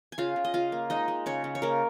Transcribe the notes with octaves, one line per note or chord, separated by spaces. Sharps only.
G#5
C#3 F4 F5
C#3
D#5
C#3 F4 F5
A#3
G#3 D#4 D#5
G#3
C#3 C#4 C#5
C#3
C#5
C#3 A#3 A#4